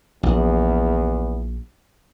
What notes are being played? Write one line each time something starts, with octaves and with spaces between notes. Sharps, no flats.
A#1 E2